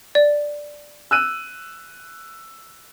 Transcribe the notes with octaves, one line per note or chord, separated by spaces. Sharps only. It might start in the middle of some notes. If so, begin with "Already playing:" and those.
D5
E6 F#6 D#7